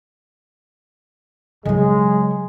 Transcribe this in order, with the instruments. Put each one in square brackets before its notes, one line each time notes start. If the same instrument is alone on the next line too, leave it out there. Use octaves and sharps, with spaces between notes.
[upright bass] C#3 F#3 [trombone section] G#3